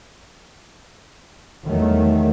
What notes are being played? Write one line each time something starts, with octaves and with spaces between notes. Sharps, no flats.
E2 D#3 F#3 G3 A3